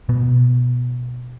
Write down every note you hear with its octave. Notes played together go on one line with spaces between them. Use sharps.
B2 B3